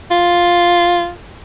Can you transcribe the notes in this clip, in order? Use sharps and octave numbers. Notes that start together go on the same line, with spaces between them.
F4